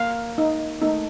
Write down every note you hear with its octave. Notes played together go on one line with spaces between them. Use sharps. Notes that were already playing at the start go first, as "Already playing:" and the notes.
Already playing: A#3 F5
D#4
A3 D#4